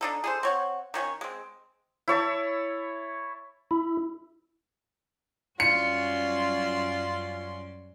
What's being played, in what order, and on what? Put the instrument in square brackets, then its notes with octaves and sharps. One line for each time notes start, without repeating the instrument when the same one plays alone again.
[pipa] D4 D#4 A4
G#4 A4 C5
C4 C#5 F#5
D#3 C#4 F#4 C#5
G#3 C4
[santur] E4 C#5 A5
[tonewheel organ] E4
[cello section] F#2 G3 C#4 [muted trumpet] F4 [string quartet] F#4 D5 C6 [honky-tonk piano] C#7